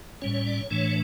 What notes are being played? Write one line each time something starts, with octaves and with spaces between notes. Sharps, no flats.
A2 G3 C#4 C#5
C#5
D5
C#5
A2 E3 A3 D4 C#5